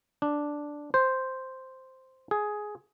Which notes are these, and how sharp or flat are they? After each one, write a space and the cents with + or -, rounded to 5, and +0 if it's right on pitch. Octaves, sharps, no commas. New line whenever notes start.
D4 +0
C5 -5
G#4 +10